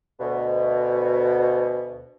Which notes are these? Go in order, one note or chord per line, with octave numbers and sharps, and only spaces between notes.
D2 B2